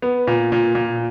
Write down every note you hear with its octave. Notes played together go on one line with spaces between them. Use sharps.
B3
A#2
A#2
A#2